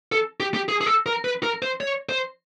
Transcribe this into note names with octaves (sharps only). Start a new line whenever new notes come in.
A4
G4
G4
G#4
G#4
A4
A#4
B4
A#4
C5
C#5
C5